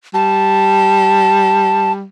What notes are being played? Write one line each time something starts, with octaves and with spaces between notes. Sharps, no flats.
G3 A5